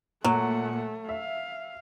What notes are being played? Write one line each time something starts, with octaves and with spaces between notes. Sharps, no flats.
A#2 F#3 A3 F#5
A3
E5 F5